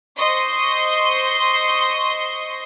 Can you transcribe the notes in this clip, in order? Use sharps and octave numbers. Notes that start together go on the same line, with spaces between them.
C5 D#5 C6 C#6